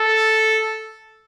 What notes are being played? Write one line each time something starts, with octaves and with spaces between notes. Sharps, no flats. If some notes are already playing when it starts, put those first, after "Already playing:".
Already playing: A4